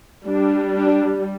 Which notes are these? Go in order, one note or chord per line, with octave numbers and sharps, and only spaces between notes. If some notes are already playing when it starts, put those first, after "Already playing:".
G3 D4
D4